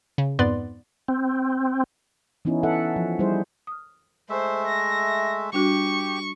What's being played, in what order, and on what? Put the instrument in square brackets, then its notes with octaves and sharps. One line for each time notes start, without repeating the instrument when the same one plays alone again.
[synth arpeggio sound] C#3
F2 G#2 B3 B4 D5 C6
[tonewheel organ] C4
[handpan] E3 B3 C#4 D#4 E4
A4 E5 F#5
F3
G3 D#4 E4 G#4 C5
[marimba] D#6 F6
[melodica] G#3 A3 E5 [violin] C5
[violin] A#6
[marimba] G3 D4 F#4 [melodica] G4 [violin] C#6